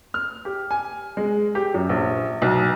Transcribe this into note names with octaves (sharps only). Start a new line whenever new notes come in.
F6
G4
G#5
G#3
G4
F#2
A#1
B1